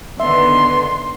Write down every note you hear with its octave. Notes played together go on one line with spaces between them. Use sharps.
D3 D#3 B3 E5 C6